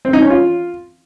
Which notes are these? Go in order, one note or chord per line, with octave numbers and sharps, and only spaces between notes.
C4
D#4
C#4
F4